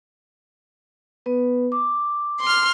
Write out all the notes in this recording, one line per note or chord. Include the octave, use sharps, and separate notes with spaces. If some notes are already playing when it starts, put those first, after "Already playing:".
B3 B4
D6
C6 F6